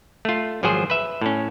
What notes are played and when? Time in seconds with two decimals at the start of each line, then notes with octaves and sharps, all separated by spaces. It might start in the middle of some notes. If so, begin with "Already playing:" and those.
0.25 A3 F4
0.63 G#1 F3 F#3 G#4 C5
0.90 B4 E5
1.21 A2 C#4